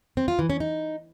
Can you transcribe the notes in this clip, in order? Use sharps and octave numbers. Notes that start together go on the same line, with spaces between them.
C4
F4
E3
C#4
D#4